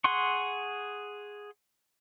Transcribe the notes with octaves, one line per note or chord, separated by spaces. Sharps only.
G#4 F#5 C6 C#6